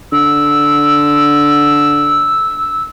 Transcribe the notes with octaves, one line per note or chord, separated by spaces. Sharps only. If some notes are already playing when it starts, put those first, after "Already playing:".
D3 E6